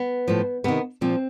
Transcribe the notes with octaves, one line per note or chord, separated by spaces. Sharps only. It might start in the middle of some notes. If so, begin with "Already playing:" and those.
Already playing: B3
A2 F3
C3 D#3 B3
A#2 F3 C4